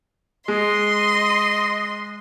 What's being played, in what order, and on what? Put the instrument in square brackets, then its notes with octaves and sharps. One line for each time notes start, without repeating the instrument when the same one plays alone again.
[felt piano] G#3 [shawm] D#5 [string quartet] C6